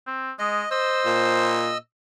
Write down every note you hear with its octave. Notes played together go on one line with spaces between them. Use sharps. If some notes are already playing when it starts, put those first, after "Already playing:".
C4
G#3 D#5
C5 D#5 E6
A#2